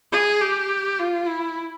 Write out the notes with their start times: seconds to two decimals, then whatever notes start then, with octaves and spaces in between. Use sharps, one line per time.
0.12 G#4
0.41 G4
0.99 F4
1.28 E4